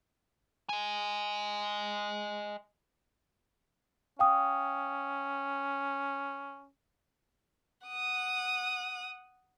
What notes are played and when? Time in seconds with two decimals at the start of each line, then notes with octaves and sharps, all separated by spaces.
0.69 D#5 G#5
4.19 C#4 F5 G5 D#6
7.87 F#5 D#6